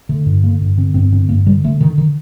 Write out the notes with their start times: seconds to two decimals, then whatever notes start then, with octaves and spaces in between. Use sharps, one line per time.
0.09 D3 A3
0.26 G2
0.43 D3 A#3
0.61 G2
0.78 D3 C4
0.94 G2 C4
1.12 D3 C4
1.29 G2 A#3
1.46 D3 G3
1.64 D3 A3
1.81 D3 D#3
1.98 D#3